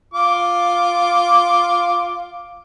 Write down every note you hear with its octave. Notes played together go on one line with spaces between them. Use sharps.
F4 D6